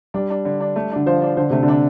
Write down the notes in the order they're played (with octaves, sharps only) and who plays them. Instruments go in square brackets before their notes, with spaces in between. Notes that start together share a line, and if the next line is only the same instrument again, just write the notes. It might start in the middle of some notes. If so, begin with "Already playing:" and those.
[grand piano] G3 [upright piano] D4
[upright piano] D4
D3
D4
A3
[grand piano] D3 [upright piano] D4
[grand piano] F3 [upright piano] C5
[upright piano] D4
[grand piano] D3 [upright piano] C5
[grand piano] C3 [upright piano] A3
[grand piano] D3
[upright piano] D4